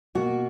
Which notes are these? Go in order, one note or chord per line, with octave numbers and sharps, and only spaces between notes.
B2 A#3 F#4